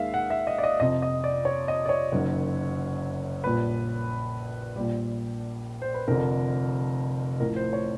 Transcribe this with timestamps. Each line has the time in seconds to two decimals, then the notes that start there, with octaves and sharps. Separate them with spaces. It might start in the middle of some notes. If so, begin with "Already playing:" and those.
Already playing: D#2 D#3 G#3 E5 F5
0.14 F#5
0.30 E5
0.47 D#5
0.58 D5
0.64 D#5
0.80 F2 C3 F3 D#5
1.02 D#5
1.24 D5
1.45 C#5
1.68 D#5
1.86 D5
1.89 C#5
2.12 F#1 F#2 D#3 F#3
3.44 A#1 A#2 G3 B4
4.76 A#1 A#2 G3
5.82 C5
5.94 B4
6.08 F1 F2 D3 A#4
7.40 A1 A2 F3 A#4
7.56 C5
7.73 C#5